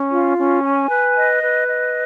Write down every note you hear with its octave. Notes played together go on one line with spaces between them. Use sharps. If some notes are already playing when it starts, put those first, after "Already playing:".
Already playing: C#4
F4
C#4
G#5
B4
D#5
B4
D#5